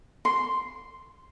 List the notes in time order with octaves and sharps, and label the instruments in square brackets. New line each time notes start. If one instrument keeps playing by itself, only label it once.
[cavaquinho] C6